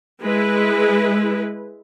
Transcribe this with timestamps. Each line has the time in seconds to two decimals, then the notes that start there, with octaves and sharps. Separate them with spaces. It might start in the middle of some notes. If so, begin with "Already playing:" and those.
0.22 G#3 E4 B4